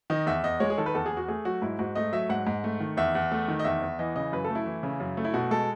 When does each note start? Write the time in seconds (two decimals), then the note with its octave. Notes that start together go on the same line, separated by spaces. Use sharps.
0.10 D#3 D#5
0.26 E2 E5
0.44 E2 D#5
0.60 G#3 C#5
0.70 G#4
0.78 D#3 A4
0.86 B4
0.94 E2 A4
1.06 G#4
1.11 E2
1.17 F#4
1.28 A3 G#4
1.45 F#3 F#4
1.62 G#2 E4
1.79 G#2 F#4
1.95 A3 D#5
2.13 F#3 E5
2.29 G#2 F#5
2.47 G#2
2.64 A3
2.80 D#3
2.97 E2 E5
3.15 E2
3.32 A3
3.48 D#3
3.59 D#5
3.64 E2 E5
3.82 E2
3.99 E3 D#5
4.16 C#3 D#5
4.32 F#2 B4
4.44 A4
4.50 A3
4.55 E4
4.66 E3
4.83 C#3
5.00 F#2
5.17 A3
5.24 E4
5.33 B2 F#4
5.51 G#3 A4